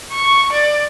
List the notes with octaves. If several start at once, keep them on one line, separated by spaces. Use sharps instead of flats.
C#6
D5